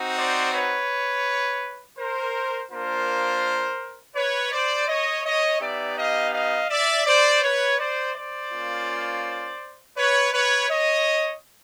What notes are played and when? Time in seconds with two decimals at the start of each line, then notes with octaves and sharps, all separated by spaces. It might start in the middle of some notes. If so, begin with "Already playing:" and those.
Already playing: C4 D#4 F#4
0.17 C5 D5
0.53 B4 C#5
1.98 A#4 C5
2.71 A#3 D4 F4 A#4 C5
4.16 B4 C#5
4.52 C5 D5
4.88 C#5 D#5
5.25 C#5 D#5
5.61 B3 D#4 G4 D5 E5
5.98 D#5 F5
6.33 D#5 F5
6.70 D5 E5
7.06 C5 D5
7.43 B4 C#5
7.79 C5 D5
8.15 C5 D5
8.52 A#3 C#4 F4
9.97 B4 C#5
10.33 B4 C#5
10.69 C#5 D#5